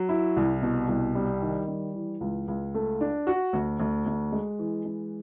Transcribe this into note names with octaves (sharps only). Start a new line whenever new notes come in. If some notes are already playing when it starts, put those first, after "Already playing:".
Already playing: F#3
E4
C2
B2
C2
G3
D#3
G3
E3
C#2
C#2
A3
D4
F#4
D2
D2
D2
G#3
E3
G#3